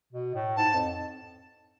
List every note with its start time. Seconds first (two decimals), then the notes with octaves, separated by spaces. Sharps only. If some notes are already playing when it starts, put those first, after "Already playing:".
0.12 B2
0.34 A2
0.57 G#2 A5
0.74 F2